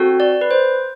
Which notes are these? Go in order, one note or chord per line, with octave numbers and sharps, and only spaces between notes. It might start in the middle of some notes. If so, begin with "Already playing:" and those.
Already playing: C4 F#4 A4
D5
B4
C5